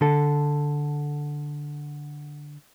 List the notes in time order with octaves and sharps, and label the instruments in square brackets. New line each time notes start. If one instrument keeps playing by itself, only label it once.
[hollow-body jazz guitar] D3 A4